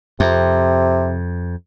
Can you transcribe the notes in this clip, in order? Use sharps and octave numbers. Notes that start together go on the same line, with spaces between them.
F2 C3